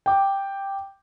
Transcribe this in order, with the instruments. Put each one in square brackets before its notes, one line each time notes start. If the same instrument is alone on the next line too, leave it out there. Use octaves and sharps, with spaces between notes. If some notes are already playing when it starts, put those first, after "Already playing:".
[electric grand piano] G5 D6